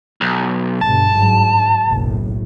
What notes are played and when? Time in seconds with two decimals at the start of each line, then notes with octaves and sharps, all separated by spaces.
0.21 B1
0.81 G1 G2 B2 A5
1.14 G#2 F#3
1.89 F#1 B1 A2